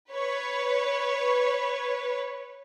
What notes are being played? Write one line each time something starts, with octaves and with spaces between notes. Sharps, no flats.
B4 C#5